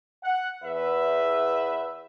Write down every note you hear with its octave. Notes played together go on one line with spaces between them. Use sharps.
F#5
E2 B4 E5